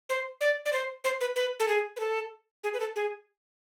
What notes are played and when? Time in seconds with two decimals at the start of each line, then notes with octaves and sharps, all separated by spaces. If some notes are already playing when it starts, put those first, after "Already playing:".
0.09 C5
0.41 D5
0.66 D5
0.73 C5
1.04 C5
1.21 B4
1.36 B4
1.60 A4
1.68 G#4
1.96 B4
2.00 A4
2.64 G#4
2.74 B4
2.80 A4
2.96 G#4